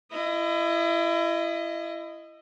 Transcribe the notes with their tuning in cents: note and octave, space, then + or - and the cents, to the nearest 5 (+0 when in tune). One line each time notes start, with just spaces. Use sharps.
E4 +30 D#5 +0